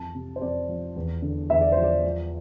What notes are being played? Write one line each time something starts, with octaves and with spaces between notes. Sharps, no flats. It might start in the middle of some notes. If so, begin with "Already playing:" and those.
Already playing: F2 E3 A5
C3
C5
F2 D5
F3
E2
D3
E2 E5
D5
F3 C5
D5
F3